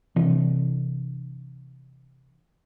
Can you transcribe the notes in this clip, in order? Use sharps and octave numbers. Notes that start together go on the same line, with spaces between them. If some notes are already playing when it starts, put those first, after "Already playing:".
C3 E3 D4